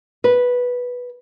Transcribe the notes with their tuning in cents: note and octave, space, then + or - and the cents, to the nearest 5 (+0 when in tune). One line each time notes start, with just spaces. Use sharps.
B4 -5